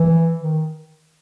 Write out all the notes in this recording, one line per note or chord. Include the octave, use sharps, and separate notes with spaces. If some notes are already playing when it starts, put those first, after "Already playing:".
Already playing: E3
D#3